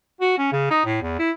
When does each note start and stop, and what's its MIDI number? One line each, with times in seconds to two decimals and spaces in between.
0.21 0.34 66
0.38 0.49 61
0.52 0.68 49
0.71 0.83 63
0.85 0.97 45
1.02 1.14 40
1.19 1.31 64